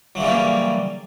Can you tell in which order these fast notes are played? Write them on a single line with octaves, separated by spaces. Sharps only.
F#3 E3 C#3 G3 A#3